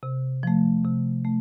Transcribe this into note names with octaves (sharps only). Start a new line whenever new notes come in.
C3
F3 A3
C3
A3